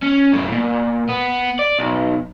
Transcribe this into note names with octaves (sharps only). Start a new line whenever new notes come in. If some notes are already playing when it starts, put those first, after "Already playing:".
C#4
F#2 A2
A#2
B3
D5
B1